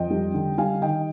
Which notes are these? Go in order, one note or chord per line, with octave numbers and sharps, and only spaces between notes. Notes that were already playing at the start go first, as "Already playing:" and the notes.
Already playing: F2 D#5 G5
G3
D3
G3 F5 G#5
D#3 D#5 G5